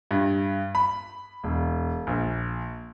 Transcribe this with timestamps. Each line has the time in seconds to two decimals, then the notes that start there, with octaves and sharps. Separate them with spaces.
0.11 G2
0.75 B5
1.44 E1
2.07 A#1